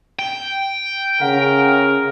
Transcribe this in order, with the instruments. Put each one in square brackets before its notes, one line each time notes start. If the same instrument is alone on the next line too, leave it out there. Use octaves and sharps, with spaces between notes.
[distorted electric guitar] G5
[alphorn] C#3 [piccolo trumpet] A#4 [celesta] F#5